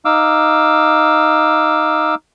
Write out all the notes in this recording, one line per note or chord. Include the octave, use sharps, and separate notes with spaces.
D#4 F5 D6 E6